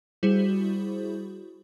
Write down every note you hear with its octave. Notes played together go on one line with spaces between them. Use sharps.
G3 E4 F#4 G#4 C5